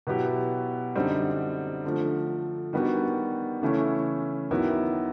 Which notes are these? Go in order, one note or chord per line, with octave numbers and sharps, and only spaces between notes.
B2 F#3 B3 E4 G4
F#2 D3 G3 C4 D#4
D3 F3 A3
D#3 G3 B3 D4 F#4
C#3 E3 A3 C#4 E4
D#2 D#3 F#3 B3 E4